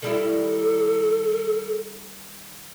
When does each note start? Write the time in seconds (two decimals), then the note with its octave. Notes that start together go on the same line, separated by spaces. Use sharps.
0.02 D#3 G3 E4 A4